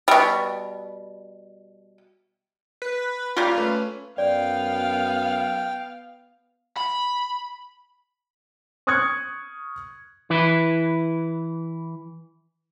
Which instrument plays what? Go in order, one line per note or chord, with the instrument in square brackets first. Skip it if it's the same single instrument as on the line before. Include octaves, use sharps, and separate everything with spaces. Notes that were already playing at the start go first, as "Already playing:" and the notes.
[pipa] B2 G3
[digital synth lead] B4
[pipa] C#3 G3 A#3 [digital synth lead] F4
[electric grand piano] A3 C#4 B4
[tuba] F#2 [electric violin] B3 F5 [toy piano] D5 [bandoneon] G5
[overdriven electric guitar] B5
[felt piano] C#6 D#6 F6 F#6 G#6 C#7
[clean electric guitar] E3 E4 B4